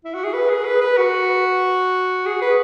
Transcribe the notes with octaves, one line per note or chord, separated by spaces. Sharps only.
E4
F#4
G#4
B4
G#4
B4
B4
F#4
G#4
B4